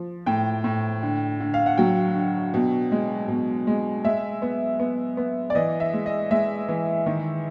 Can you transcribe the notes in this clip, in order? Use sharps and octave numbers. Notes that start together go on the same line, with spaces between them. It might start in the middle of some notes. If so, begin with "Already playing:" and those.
Already playing: F3
A2 G5
A2
D3
D3
F5
F#5
F#3 G5
D3
B2
G#3
B2
G#3
G#3 E5
B3
B3
B3
D5
E3 D#5
E5
G#3
D#5
G#3 E5
E3
D#3